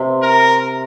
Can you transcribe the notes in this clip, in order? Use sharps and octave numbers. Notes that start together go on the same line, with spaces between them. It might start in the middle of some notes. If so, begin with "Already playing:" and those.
Already playing: C3
A#4